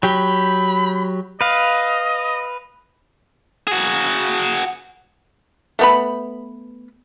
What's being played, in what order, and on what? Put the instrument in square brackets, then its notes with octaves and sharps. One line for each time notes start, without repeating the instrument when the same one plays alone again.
[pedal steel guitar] F#3 G4 [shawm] B5
[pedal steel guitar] B4 F5 [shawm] D#5
[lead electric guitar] F#4 G#4
[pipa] A3 B3 B5